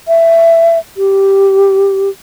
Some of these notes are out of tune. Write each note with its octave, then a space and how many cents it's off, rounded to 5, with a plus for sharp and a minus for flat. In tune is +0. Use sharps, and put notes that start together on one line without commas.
E5 +15
G4 -5